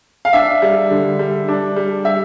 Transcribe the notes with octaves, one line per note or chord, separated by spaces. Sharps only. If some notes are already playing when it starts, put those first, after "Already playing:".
F5
D4 E5
G3
D3
G3
D4
G3
G3 E5